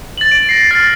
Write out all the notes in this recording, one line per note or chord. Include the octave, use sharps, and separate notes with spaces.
A6 F#7
D7
A#6 C7
F6 A6